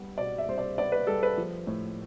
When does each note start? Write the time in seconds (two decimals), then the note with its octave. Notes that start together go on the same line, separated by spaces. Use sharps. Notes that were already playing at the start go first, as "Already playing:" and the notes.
Already playing: C2 G3 B3
0.18 B2 D5
0.38 E5
0.48 C2 C5
0.58 D5
0.78 B3 D5
0.92 B4
1.07 G3 A4
1.23 B4
1.38 F3
1.67 A2